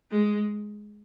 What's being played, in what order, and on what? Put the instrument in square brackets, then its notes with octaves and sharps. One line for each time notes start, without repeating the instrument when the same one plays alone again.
[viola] G#3